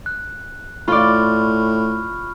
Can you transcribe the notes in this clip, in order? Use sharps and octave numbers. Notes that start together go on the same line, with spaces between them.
F#6
A2 F4 D5 B5 C#6 F6